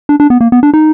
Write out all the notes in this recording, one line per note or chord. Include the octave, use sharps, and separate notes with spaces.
D4
D4
B3
A#3
B3
D4
D#4